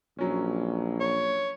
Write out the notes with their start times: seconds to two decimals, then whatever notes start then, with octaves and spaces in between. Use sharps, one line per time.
0.19 A#1 F#3 C#4
1.00 C#5